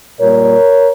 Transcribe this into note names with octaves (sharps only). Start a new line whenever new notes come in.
A#2 G3 A#3 A#4 C#5